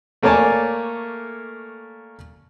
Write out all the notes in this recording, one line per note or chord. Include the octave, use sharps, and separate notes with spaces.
A3 A#3 C#5 D5 G#5 A5